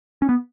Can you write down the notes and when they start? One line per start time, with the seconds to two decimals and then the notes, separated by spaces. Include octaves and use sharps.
0.22 C#4
0.29 B3